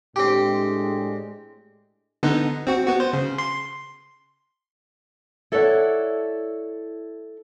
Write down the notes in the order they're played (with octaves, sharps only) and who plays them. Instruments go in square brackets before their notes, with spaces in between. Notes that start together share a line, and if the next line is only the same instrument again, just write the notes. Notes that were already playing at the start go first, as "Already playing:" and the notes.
[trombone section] A2 G#3 D4 [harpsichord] C4 G4
[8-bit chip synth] D3 B3 D#4
C4 F#4
B3 F#4
C5
C#3
C6
[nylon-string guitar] E4 A4 C#5 D5 E5 F#5